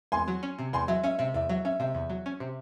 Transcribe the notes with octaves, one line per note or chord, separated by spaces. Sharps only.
E2 G#5 C6
F#3
C#4
C3
E2 G#5 C6
F#3 E5
C#4 E5
C3 E5
E2 E5
F#3 E5
C#4 E5
C3 E5
E2
F#3
C#4
C3